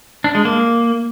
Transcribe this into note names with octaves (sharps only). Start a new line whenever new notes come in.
D4
G#3
A#3